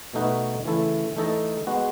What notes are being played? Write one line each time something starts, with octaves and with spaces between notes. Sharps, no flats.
B2 A3 D#4 F#4 B4
C#3 E3 A3 E4 A4
E3 A3 D#4 A4 D#5
G#3 B3 F#4